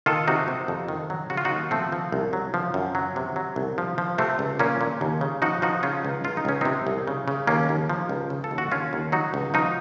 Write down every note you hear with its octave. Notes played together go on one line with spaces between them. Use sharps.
D#3 F4 A4
C3 D#4 F#4
C3
F2
D#3
F#3
C#3 F#4
F4
D#4 F#4
D#2
F3 A3 C4
F3
C2
F#3
F3
F#2
F#3
C3
F#3
C2
F3
F3
C3 A3 C4
C#2
A#2 A#3 C#4
A#2
D#2
C#3
F3 D#4 F#4
F3 D#4 F#4
C#3 C#4 F4
C#2
C#2 F4
D#4
C#2 C#4
C3 C4 D#4
C2
C#3
C#3
D#2 A#3 C#4
D#2
F3
C#2
C#3
A4
D#2
F#4
D#2 C#4 F4
D#2
F#3 D#4 F#4
C#2
F3 D#4 F#4